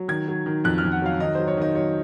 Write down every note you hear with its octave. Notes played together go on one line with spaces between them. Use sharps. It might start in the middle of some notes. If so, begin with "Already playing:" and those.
Already playing: F#3
D#3 G#6
F#3
D#3
F2 F#6
F6
F2
F#5
F#3 F5
D#3 D#5
F#3 C5
C#5
D#3 D#5
F#3 C#5